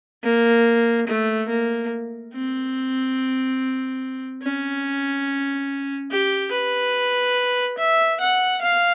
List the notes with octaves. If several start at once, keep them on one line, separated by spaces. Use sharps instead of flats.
A#3
A3
A#3
C4
C#4
G4
B4
E5
F#5
F5